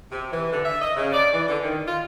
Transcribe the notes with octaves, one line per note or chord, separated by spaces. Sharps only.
C3
E3
D3
E5
D#5
C#3
D5
E3
D3
D#3
F4